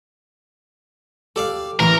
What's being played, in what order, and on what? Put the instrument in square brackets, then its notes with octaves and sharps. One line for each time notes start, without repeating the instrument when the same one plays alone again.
[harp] G4 [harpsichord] A4 D5 F5
[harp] A1 [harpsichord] E3 [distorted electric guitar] A#4